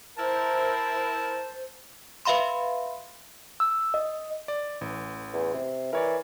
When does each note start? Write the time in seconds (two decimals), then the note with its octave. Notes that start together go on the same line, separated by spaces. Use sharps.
0.18 E4 A#4 C5 A5
2.25 B4 E5 F5 B5 C6
3.60 E6
3.94 D#5
4.48 D5
4.81 A1 E3
5.34 E2
5.54 C3
5.93 E3 A#4 C#5 D5